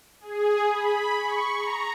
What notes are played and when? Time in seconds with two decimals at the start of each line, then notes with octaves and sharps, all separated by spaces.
0.20 G#4
0.68 B5
1.18 C#6
1.57 A#5